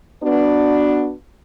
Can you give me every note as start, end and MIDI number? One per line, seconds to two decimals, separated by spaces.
0.23 1.12 59
0.23 1.12 62
0.23 1.12 66